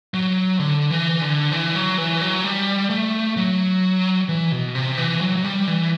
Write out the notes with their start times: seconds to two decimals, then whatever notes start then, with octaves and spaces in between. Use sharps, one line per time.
0.14 F#3
0.60 D3
0.91 E3
1.22 D3
1.52 E3
1.75 F#3
1.98 E3
2.21 F#3
2.44 G3
2.90 A3
3.37 F#3
4.29 E3
4.52 B2
4.75 C3
4.98 E3
5.21 F#3
5.37 F#3
5.44 G3
5.67 E3